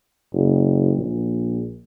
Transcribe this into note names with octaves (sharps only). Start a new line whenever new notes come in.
F#1
A#1